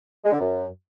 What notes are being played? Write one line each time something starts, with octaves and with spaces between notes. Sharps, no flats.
G#3
D3
F#2